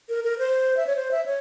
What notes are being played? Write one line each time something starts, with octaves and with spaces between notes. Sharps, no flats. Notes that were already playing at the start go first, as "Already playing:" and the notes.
A#4
A#4
C5
E5
C#5
C5
E5
C#5